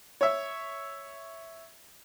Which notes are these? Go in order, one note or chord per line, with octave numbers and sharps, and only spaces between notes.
C#5 E5